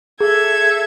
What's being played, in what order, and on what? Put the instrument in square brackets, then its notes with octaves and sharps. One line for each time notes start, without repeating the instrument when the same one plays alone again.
[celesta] G#4 [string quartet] A4 E5 G#6